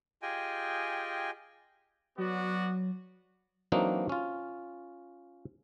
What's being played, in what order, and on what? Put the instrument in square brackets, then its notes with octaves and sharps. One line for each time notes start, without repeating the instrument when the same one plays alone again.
[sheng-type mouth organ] F4 G4 G#4 D#5 G5 G#5
[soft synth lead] F#3 [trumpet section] B3 F#4 D5
[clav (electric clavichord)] E3 F#3 A#3 C4 D4 D#4
C#4 F4